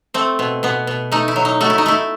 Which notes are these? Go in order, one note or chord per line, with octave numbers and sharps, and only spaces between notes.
A3 C4
B2
B2 B3
B2
A3 D#4
E4
F#3
D#4
A3 F#4
E4
D#4
A3 E4